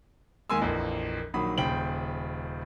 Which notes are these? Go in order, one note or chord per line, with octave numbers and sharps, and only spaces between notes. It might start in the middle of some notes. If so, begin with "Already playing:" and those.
D#2 G#3 A#4 G#5 C6 E6
A#1 F2 E3 A#3
A#1 D#3 F#3 B5 D#6
D#1 C#3 C5 G5 B5 F#7